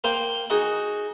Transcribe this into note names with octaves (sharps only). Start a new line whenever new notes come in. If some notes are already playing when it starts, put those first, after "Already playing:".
A#3 C5 F5 G5
D#4 F#4 G#4